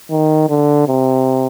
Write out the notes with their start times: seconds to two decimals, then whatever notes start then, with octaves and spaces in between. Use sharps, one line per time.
0.11 D#3
0.49 D3
0.88 C3